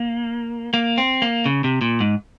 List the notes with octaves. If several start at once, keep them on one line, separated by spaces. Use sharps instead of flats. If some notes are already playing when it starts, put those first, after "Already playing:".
Already playing: A#3
A#3
C4
A#3
C#3
C3
A#2
G#2